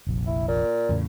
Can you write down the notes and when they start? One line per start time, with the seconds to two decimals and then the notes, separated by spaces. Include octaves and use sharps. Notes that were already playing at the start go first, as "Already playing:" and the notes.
0.07 F1 A#1
0.27 E4
0.48 A#2
0.89 E2 A2 C#3